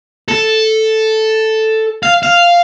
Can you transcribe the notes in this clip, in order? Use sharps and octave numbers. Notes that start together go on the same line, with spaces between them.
A4
F5
F5